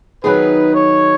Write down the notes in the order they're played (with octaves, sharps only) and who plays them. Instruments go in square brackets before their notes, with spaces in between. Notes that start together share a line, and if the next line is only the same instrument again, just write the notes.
[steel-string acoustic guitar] D#3 F#3 B3 D#4 G#4 [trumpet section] B4
[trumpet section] C#5